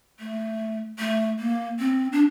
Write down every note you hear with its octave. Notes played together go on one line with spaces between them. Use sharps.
A3
A3
A#3
C4
D4